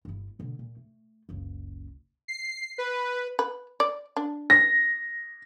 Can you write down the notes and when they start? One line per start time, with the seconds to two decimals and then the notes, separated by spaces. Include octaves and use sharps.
0.05 G1 E4
0.39 B2 D3
0.59 A#2
0.77 A3
1.29 F#1 C#2
2.28 C7
2.78 B4
3.39 B4
3.80 D5
4.16 D4
4.50 A#6